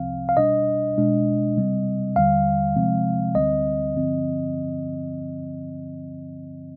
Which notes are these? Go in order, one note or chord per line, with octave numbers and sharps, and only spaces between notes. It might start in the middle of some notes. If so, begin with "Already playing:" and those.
Already playing: C2 C3 F3 C4 F5
F5
B2 G3 D4 D#5
B2 G#3 D4
C3 G3 C4
D#2 D3 G3 F5
C3 F3 G#3 C4
D2 D3 G3 C4 D#5
G2 D3 F3 C4